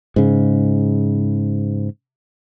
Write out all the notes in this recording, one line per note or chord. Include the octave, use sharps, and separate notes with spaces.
G#2 C#3